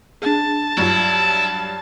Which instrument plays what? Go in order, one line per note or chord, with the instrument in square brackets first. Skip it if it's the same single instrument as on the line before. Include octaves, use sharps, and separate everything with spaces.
[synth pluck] D4 G#4 [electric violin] A5
[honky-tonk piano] G2 F#3 [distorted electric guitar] E4 [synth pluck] F4 C#6